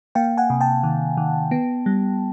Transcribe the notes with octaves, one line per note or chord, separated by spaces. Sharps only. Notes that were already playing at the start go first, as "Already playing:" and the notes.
A#3 F5 G5
F#5 G#5
C3
G5 A5
D#3
D#3
B3
G3